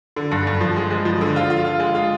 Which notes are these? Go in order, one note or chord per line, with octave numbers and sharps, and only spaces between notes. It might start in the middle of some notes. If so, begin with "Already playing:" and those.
D3
G2
G2
F3
G#3
G#3
F3
D3
F4
F4
F4
G#3
F4